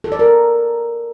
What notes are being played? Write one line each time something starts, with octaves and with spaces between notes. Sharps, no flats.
A4
D5
A#4